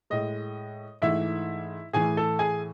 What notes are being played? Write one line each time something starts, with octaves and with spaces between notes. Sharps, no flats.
A2 G#3 D#5
G#2 E3 A3 E4 E5
A2 E3 A3 G#4 G#5
A4 A5
G#4 G#5